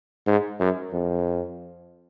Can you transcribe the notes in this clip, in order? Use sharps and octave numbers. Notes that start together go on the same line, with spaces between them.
G#2
F#2
F2